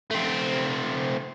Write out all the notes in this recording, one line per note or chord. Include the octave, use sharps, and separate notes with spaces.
A3 C4